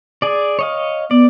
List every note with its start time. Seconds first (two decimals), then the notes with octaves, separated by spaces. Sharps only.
0.22 G#4 D5
0.59 C#5 D#5 F5
1.11 B3 D5